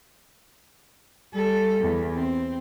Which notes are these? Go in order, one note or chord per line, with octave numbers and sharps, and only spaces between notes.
G3 A4
E2
C4